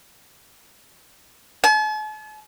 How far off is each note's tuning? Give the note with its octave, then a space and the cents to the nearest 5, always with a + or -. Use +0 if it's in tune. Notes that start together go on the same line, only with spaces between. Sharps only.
A5 -45